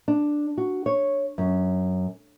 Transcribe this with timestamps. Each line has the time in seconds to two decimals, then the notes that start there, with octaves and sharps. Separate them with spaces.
0.08 D4
0.58 F#4
0.86 C#5
1.38 F#2